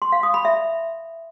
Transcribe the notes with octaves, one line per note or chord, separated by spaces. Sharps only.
C6
F5
D#6
B5
E5